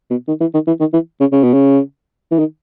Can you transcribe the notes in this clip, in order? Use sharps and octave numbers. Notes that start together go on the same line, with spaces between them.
B2
D#3
E3
D#3
E3
D#3
E3
C#3
C#3
B2
C#3
E3
D#3